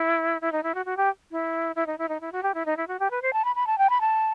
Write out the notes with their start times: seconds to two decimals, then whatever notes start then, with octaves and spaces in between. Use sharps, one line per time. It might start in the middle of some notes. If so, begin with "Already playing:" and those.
Already playing: E4
0.41 E4
0.52 D#4
0.63 E4
0.75 F#4
0.86 F#4
0.97 G4
1.31 E4
1.76 E4
1.87 D#4
1.98 E4
2.09 D#4
2.21 E4
2.32 F#4
2.43 G4
2.54 E4
2.66 D#4
2.77 E4
2.88 F#4
3.00 G4
3.11 B4
3.22 C5
3.33 A5
3.45 B5
3.56 B5
3.67 A5
3.78 G5
3.90 B5
4.01 A5